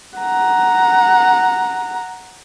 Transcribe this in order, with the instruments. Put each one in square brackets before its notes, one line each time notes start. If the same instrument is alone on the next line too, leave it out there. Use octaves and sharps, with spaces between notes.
[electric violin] F#5 A#5